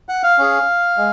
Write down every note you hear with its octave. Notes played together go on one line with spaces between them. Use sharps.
F#5
F5
C#4 G#4
G#3